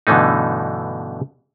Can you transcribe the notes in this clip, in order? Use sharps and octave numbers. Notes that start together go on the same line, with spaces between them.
G2 B2 D3 E3 A3 D#4